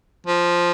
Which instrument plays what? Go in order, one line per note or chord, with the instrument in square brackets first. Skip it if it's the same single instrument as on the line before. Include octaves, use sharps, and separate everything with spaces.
[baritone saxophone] F3